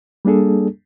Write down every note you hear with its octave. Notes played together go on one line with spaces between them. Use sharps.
G3 A#3 D4 G#4 A4